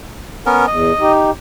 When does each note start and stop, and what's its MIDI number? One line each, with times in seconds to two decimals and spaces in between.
0.46 0.66 59
0.46 0.66 61
0.46 0.66 70
0.67 0.92 40
0.67 1.12 75
0.99 1.31 63
0.99 1.31 67